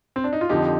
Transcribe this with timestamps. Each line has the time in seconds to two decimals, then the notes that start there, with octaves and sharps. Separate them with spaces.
0.16 C4
0.24 D4
0.33 D#4
0.41 F4
0.49 F2 D3 F3 D#4 G4